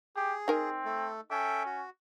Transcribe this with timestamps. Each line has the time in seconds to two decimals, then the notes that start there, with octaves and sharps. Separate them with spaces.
0.16 G4 G#4
0.48 C4 D#4 A#4 G#5
0.85 A3 A4
1.31 C#4 A4 E5 G5
1.66 F#4